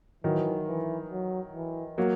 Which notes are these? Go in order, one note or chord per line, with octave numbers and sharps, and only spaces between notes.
D#3 E3 F#3
E3
F#3
E3
F#3 A#3